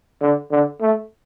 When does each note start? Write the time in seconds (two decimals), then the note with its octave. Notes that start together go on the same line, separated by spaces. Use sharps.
0.21 D3
0.51 D3
0.81 A3